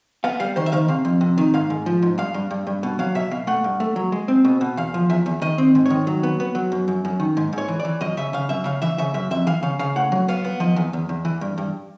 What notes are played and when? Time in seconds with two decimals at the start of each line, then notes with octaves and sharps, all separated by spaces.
0.24 B3 F5
0.40 G3 F5
0.56 D#3 C5
0.66 E5
0.72 D#3 F5
0.88 C3 F5
1.05 F2
1.21 C3
1.38 D#3
1.54 G#2 F5
1.70 G#2
1.86 F3
2.02 G#2
2.18 G2 F5
2.34 G2
2.50 G2
2.67 G2
2.83 B2
2.99 F#3 F5
3.15 B2 E5
3.31 B2 F5
3.47 A3 F#5
3.64 G2
3.80 A3
3.96 F#3
4.12 G#3
4.28 C4
4.45 B2
4.61 B2
4.77 E2 F5
4.94 F3
5.10 E2 E5
5.26 E2
5.42 D#3 D#5
5.58 C4
5.75 G#2
5.86 D#3 C#5
6.07 F#3
6.23 B3
6.40 B3
6.55 F#3
6.72 F#2
6.88 F#2
7.05 F#2
7.20 D#3
7.37 G#2
7.53 G#2
7.58 C#5
7.68 E3
7.80 D5
7.85 E3
8.01 F#2 D#5
8.17 C#3 E5
8.33 C#3 F5
8.49 F#2 E5
8.65 C#3 F5
8.82 E3 E5
8.98 C#3 E5
9.14 F#2 E5
9.31 F2 E5
9.47 E3 F5
9.63 C#3 F5
9.79 C#3 F5
9.96 A2 F#5
10.12 F#3
10.28 B3 F5
10.44 B3
10.60 F3 D#5
10.76 E2
10.93 E2
11.09 E2
11.25 E3
11.41 G2
11.58 G2